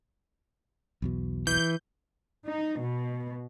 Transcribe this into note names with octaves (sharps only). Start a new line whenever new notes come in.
B1 E2 B2
E3 G6
D#4
B2